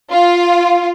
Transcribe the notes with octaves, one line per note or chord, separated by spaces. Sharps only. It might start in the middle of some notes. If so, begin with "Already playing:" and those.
F4